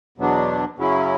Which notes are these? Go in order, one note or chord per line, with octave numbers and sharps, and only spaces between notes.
E2 B2 F#3 B3 D4
F#2 C#3 F#3 C#4 E4